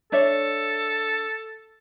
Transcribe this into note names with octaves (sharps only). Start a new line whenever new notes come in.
D4 A4 C#5 E5